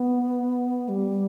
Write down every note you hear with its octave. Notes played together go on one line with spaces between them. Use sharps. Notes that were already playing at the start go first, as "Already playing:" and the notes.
Already playing: B3
G3